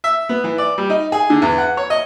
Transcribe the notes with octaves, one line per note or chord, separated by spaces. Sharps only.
E5
B3
E3
D5
G3
D#4
G#4
D3
E2
F#5
C#5
D#5